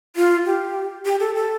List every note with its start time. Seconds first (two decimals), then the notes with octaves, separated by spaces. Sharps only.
0.16 F4
0.46 G4
1.05 G4
1.20 A4
1.35 A4